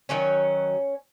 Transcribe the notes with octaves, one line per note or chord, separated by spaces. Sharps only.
D#3 F#3 C#4 C#5